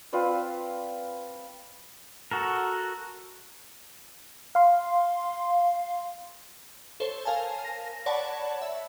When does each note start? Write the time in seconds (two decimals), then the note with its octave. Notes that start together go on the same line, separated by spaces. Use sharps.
0.13 C4 F4 B4 D5
2.31 F#4 A4 A#4
4.55 F5 C6
7.00 A4 C5 C#5
7.25 A#4 F5 G#5 A5
7.65 A#6
8.06 C#5 D5 F#5 A5 B5
8.62 E5